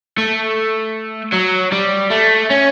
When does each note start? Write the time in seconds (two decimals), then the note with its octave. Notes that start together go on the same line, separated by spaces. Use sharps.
0.18 A3
1.33 F#3
1.72 G3
2.10 A3
2.50 C#4